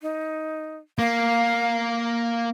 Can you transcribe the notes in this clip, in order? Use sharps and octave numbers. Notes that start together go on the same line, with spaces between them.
D#4
A#3 F5